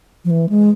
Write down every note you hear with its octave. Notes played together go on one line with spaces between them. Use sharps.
F3
E3
G#3